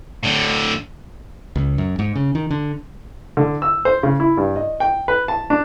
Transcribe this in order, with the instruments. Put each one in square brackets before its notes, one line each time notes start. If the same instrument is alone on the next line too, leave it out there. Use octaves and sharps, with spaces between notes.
[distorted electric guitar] A2 D3
[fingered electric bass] C#2
F#2
G#2
C#3
D#3
D3
[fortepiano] D3
E6
C5
C#3
E4
G2
D#5
G5
B4
A5
D4